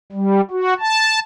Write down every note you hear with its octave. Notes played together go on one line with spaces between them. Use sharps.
G3
F#4
A5